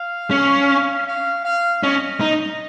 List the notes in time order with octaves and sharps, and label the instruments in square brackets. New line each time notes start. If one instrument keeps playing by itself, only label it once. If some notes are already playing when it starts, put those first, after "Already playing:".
Already playing: [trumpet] F5
[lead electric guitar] C#4
[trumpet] F5
F5
[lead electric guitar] C#4 [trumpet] D#5
[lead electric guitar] D#4